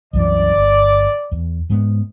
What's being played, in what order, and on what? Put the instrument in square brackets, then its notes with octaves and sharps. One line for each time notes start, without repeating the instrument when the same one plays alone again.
[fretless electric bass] C2 F#2 E3 [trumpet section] D5
[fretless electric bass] G1
E2
G#2 G#3 B3